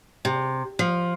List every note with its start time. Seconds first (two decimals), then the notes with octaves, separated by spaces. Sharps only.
0.25 C3
0.79 F3